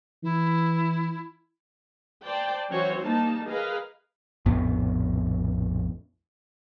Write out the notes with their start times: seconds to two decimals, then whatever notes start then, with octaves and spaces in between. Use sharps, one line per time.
0.23 E3 E4
2.24 C5 D5 G5 A5
2.71 E3 F#3 C#4 F#4 C5 C#5
3.02 G3 A#3 D#4 A5
3.48 G#4 A#4 B4 D#5 F5
4.46 A#1 F2 A2 B3